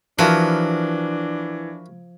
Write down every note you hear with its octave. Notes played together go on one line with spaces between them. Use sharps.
E3 F3 D4 E4 F#4 A#4